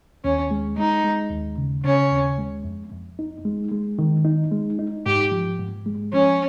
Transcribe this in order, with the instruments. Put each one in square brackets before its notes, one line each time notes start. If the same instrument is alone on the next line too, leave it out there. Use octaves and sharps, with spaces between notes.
[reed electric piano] D#2 [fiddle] C#4
[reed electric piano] G#3
[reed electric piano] G#3 [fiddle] D#4
[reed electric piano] G#3
D#2
C#3
[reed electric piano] C#3 [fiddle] C#4
[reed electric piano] D#2
G#3
F2
F2
D#4
G#3
G#3
D#3
D#4
G#3
D#4
[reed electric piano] G#2 [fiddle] G4
[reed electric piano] F3
G#2
G#3
[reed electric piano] F3 [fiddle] C#4